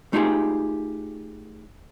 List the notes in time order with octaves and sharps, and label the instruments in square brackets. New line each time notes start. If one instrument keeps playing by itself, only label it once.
[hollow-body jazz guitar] A3 D#4 F4 G4 G#4